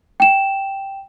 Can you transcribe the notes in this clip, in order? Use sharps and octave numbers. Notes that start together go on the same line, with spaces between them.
G5 E7